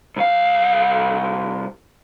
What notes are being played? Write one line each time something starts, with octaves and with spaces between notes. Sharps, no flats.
C2 F5